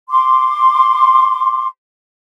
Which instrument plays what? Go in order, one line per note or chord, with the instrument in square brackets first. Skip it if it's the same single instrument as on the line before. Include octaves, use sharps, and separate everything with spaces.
[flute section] C6 D6